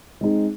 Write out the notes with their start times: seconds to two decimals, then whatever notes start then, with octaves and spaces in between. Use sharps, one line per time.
0.21 G#3 C4 D#4 G#4